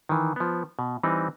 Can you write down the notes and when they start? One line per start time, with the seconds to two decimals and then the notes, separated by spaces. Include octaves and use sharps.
0.09 D#3 E3
0.36 F3 B3
0.79 B2
1.03 E3 G3 C4 D#4